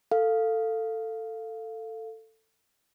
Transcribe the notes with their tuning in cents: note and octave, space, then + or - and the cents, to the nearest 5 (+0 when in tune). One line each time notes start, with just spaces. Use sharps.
A4 +15 F5 +0